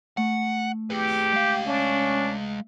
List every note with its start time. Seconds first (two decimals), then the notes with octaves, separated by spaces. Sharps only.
0.17 A3 F#5
0.90 G4 G#4 B4
1.33 G#3 F5
1.67 C#4 D4 E5